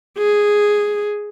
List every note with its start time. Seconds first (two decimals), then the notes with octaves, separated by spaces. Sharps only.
0.18 G#4